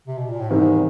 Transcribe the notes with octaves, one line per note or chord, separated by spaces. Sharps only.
C3
B2
A#2
A2
E2 G#2 C3 D#3 G3